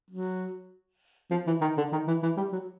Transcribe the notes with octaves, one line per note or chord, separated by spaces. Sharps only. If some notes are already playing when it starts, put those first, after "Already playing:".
F#3
F3
E3
D#3
D3
D#3
E3
E3
G3
F#3